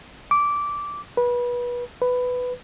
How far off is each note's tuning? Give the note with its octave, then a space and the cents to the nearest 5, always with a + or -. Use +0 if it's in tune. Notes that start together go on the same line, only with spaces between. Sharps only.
D6 -10
B4 -25
B4 +10